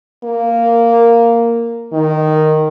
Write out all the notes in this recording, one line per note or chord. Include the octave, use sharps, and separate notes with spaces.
A#3
D#3